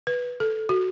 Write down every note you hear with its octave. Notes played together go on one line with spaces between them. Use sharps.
B4
A4
F#4